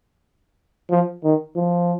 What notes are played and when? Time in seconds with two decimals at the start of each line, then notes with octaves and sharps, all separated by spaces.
0.91 F3
1.24 D#3
1.56 F3